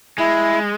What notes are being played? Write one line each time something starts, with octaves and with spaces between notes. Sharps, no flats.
G#3 E4